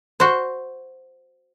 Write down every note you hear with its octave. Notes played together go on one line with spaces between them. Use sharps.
F#4 C5